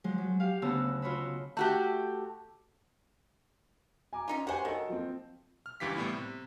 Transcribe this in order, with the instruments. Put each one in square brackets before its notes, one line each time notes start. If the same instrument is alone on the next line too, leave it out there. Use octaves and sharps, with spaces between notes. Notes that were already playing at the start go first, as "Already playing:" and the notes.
[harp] F3 F#3 G#3
F#3
G4 F5
D2 C#3 B3 F#4 A5 E6
F4 F#4 C#5 D#5 B5 E6
[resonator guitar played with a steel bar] A3 F#4 G4
[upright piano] G#5 A#5 D6
[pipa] C#4 D#4 F4
[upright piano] G4 C#5 G#5 [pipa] C5 F#5
[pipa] D#3 [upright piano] F#4 A4 D#5
[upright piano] F3 C4
[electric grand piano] F6
C#2 G2 E3 G4 F5 B6
A2 G3 B3 E4
C3